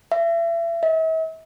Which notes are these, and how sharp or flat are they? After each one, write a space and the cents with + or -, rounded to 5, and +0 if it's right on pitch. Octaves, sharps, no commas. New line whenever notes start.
E5 +35
E5 -45